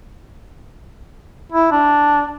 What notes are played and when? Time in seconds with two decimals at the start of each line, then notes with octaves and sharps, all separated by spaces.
1.52 E4
1.72 D4